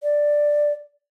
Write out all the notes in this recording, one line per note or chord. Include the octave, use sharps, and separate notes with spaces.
D5